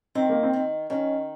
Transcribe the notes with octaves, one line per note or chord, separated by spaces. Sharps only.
D#3 C4
A#3
C4
D#3
D#3 C#4